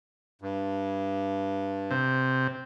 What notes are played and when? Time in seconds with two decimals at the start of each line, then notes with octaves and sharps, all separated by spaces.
0.42 G2
1.91 C3